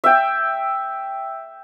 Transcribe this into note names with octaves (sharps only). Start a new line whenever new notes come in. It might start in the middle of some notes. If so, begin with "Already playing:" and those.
E5 G5